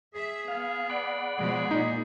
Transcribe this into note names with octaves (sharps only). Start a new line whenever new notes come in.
G#4 E5
B3 F5
D5 F#5 B5
B2 F3 G#3 G#4
A#2 D#4